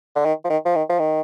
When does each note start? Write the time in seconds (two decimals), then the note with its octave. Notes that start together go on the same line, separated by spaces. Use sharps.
0.16 D3
0.25 D#3
0.44 F3
0.50 D#3
0.65 F3
0.75 D#3
0.90 F3
0.99 D#3